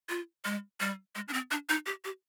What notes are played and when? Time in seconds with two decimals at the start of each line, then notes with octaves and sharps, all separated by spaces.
0.09 F4
0.45 G#3
0.80 G3
1.15 G#3
1.28 D4
1.33 C4
1.51 D4
1.69 D#4
1.86 G4
2.04 G4